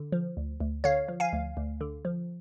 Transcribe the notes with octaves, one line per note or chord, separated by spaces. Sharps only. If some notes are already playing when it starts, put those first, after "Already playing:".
Already playing: D3
F3
D2
D2
D3 C#5 F5
F3
F5 G#5
D2
D2
D3
F3